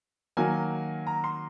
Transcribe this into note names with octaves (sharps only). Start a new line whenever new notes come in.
D#3 F#3 A#3 G#5
A#5
C6